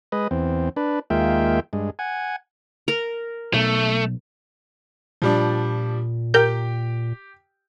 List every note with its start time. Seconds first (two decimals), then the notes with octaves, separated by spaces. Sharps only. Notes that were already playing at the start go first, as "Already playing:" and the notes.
0.12 G#3 B4 D#5
0.31 E2 C4
0.77 D4 B4
1.10 D#2 G#3 A#3 F4 E5 G5
1.73 G2 G#3
1.99 F#5 G#5
2.88 A#4
3.54 B1 A3
5.22 A#2 F3 G3 D4
6.34 G4 A#4 G5 G6